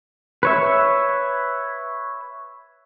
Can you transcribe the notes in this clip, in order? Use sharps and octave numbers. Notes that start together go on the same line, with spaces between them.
B4 C#5 E5